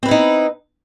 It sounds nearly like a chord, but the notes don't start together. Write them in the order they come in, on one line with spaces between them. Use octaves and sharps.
C4 B4 E4 D#4